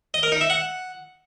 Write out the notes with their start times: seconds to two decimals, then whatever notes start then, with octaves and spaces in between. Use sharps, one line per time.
0.14 D#5
0.23 A#4
0.32 D#4
0.41 E5
0.50 F#5